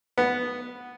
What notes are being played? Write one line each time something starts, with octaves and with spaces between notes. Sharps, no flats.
B3